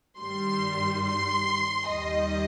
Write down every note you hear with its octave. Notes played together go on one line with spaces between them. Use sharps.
G2 D#3 G3 C6
C6
D#2 D#3 G3 D#5